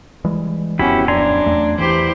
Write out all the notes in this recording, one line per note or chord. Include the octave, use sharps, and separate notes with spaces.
E3 G3 G#3
D1 F2 B3 C#4 E4 F#4 G4 B5
F#2 D4 G#5 A#5 C6
E2 A3
E2 E3 E4 G4 C5